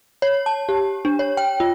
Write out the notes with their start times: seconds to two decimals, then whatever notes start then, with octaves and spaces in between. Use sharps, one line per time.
0.22 C#5
0.46 A5
0.69 G4
1.05 D4
1.19 C#5
1.37 G5
1.60 F4